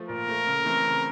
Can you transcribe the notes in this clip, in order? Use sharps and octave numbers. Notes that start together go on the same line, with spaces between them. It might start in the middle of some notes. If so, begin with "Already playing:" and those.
Already playing: F3 A3
A#2 A#4
F3 A3
C#3
E3 A3 C4 E4
C#3